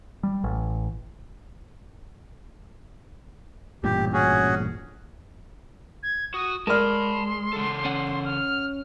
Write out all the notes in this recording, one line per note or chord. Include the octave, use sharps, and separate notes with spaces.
G3
A1
A1 G2 A#2 G4
C#4 F#4 G#4
G#6
F#4 D#6
G#3 A#4 D5 A5 B5 C6 F6
C#3 A4
C#4 F#5
F6